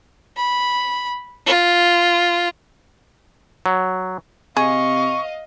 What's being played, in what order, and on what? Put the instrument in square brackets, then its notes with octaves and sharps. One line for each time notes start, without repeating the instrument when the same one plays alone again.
[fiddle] B5
F4
[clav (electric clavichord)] F#3
[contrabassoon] C3 [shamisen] G#4 [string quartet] D#5 F5 [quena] C#6